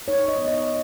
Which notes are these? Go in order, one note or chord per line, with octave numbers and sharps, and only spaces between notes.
D#4 C#5
D#5
B3
D#5